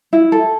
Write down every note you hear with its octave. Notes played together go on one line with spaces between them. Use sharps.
E4
A4